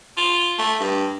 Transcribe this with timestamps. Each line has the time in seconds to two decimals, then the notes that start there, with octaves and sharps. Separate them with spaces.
0.17 F4
0.59 A3
0.80 G2